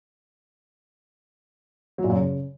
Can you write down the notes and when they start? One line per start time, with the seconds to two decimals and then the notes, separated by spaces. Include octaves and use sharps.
1.98 F#3
2.04 A#2
2.10 F#2
2.16 C#3